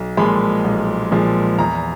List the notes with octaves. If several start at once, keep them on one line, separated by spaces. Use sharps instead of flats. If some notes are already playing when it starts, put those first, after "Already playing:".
Already playing: B1
A#2 F3 G#3 B5
B1
A#2 F3 G#3
E2 A#5